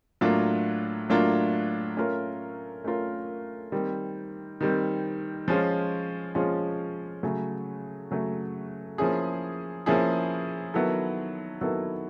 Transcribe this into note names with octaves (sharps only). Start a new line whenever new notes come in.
A2 F#3 A#3 D4 F4
A2 F#3 A#3 D4 F4
A3 C#4 F4 A#4
A3 C#4 F4 A#4
D#3 G3 C4
D#3 G3 C4
F3 G#3 C#4 F4
F3 G#3 C#4 F4
C#3 F#3 A3
C#3 F#3 A3
F3 A#3 C#4 E4 G#4
F3 A#3 C#4 E4 G#4
D#3 F#3 B3 E4 A4
D#3 F#3 B3 E4 A4